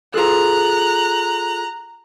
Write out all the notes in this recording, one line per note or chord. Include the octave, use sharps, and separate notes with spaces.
F4 G#4 A4 A#5 F#6